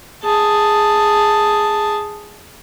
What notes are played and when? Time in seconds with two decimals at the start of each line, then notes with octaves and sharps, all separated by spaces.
0.23 G#4 A5